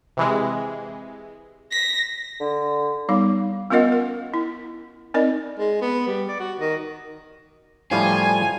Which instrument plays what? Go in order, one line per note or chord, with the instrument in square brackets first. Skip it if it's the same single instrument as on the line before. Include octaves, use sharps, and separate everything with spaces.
[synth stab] C3 E3 G#3
[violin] A#6 [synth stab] B6
[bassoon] D3
[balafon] G3 B3 D#4 F5
B3 C#4 F4 A#4 D#5 F#5
A#4
E4
C4 D#4 A#4 D5 D#5
[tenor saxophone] G#3
B3
G3
D5
F#4
D#3
[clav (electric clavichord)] A2 F3 G3 [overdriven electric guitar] F4 [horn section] G#5